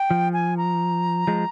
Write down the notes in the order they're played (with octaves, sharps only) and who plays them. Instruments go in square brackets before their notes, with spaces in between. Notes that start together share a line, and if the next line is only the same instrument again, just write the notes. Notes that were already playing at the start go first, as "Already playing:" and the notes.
Already playing: [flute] G5
[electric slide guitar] F3
[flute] G#5
A#5
[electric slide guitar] F3 G#3